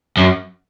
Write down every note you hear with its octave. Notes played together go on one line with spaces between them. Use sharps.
F#2